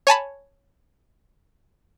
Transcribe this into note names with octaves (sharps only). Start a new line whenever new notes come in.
C#5 G#5 A5 B5